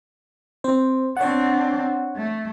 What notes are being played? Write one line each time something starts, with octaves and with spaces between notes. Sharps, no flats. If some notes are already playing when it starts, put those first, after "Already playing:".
C4 C5
C4 D4 C#5 F#5
A3